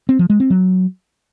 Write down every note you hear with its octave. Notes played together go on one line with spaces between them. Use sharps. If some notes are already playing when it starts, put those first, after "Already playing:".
C4
F3
G#3
C4
F#3